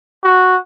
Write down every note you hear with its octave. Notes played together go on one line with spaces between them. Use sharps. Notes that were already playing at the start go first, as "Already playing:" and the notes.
F#4